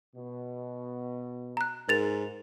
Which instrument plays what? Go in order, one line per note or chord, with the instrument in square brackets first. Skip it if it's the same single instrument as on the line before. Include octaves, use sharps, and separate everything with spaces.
[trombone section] B2
[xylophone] A#5 F#6
[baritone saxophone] G#2 [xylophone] A#4 A6 F7